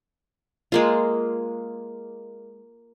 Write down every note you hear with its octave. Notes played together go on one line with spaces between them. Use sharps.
G#3 A#3 F4